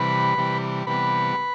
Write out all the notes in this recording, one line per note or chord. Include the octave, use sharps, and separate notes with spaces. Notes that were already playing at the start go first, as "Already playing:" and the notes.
Already playing: C3 E3 G3 B4 B5
C3 E3 G3
C3 E3 G3 B3 B4 B5